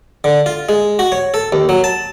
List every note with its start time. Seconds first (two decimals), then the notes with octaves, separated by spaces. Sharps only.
0.24 D3
0.46 F4
0.69 G#3
0.99 F#4
1.12 C#5
1.34 A4
1.52 D#2
1.69 F#3
1.84 A5